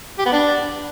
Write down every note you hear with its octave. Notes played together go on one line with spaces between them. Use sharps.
G4
B3
D4